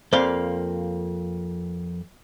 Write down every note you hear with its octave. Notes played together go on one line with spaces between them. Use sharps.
F2 A#3 C5 D5 F5 C6